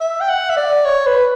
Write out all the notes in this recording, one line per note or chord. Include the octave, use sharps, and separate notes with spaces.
E5
G5
F#5
E5
D5
C#5
B4